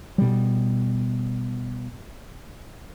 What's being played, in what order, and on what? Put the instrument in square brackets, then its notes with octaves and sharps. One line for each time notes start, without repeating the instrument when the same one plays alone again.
[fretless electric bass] B2 G3